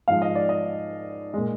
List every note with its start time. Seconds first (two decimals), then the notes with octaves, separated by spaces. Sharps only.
0.08 G#2 F3 G#3 F5
0.22 D#5
0.35 D5
0.49 D#5
1.34 A#2 G#3